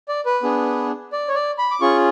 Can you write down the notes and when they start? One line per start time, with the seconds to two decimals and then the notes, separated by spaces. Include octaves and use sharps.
0.08 D5
0.26 B4
0.43 B3 D4 G#4
1.13 D5
1.28 C#5
1.35 D5
1.59 B5
1.71 D6
1.81 C#4 F4 G#4 C#6